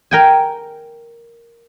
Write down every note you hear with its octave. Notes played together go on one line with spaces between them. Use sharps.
A#4 G5 G#5